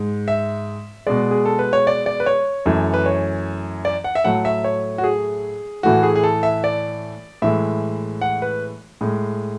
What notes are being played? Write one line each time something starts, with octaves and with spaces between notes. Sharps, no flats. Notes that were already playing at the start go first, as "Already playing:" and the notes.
Already playing: G#2 G#3
E5
B2 G#3 D5
G#4
A4
B4
C#5
D5
D5
B4
C#5
F#2 E3 A3
B4
C#5
D5
F#5
E5
A2 F#3 A3 F#5
E5
C#5
F#4
G#4
A2 E3 A3 F#4
G#4
G#4
A4
E5
D5
A2 E3 G#3 E5
F#5
B4
A2 G#3